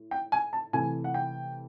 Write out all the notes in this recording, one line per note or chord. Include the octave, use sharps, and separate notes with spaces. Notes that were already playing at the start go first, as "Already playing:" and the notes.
Already playing: A2
G5
G#5
A5
C3 E3 A3 G#5
F#5
G5